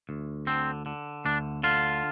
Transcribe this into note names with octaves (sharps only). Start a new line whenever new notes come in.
D2
D3 C4
D3
D2 D4
D3 F4